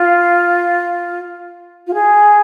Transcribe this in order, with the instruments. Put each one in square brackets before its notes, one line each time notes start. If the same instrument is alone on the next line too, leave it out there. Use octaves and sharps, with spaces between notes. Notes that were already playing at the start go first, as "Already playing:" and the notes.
Already playing: [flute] F4
F4
G#4